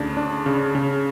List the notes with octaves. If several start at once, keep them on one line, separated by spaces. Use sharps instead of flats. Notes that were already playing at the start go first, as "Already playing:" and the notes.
Already playing: D2 C#3 D4
D4
C#3
C#3